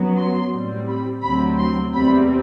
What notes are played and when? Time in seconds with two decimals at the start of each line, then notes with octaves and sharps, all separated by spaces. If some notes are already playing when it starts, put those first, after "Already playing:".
Already playing: F#2 F#3 B3
0.17 C6
0.53 A2 G3 C4
0.88 B5
1.23 D2 C3 F#3 C4 B5
1.58 C6
1.93 E2 C3 G3 C4 B5